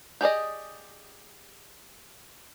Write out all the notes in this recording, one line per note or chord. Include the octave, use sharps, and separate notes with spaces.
G4 G#4 D5 D#5